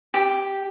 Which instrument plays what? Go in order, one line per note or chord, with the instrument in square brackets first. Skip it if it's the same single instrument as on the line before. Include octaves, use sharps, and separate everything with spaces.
[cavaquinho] G4